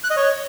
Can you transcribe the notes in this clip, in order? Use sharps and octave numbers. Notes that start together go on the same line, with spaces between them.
F#6
D#5
C#5